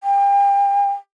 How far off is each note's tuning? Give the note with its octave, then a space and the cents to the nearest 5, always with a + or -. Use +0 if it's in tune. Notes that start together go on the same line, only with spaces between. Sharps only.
G5 +35